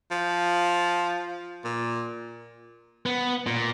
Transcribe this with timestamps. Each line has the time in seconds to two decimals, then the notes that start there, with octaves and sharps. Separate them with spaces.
0.11 F3
1.64 A#2
3.06 B3
3.47 A#2